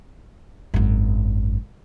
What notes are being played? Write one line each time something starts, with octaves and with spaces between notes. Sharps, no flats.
G#1 F#2